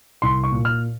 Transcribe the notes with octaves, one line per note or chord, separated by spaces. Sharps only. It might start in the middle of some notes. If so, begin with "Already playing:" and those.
C2 C6
C#6
A#2
F6